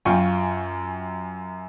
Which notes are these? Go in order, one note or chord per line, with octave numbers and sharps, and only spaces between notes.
F#2 F4 G5 G#5 C#6